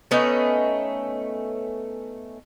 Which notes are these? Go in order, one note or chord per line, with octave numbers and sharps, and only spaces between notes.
A3 B3 C#4 D#4